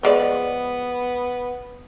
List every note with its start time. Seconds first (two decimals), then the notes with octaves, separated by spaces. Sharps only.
0.03 F3 G#3 B3 D5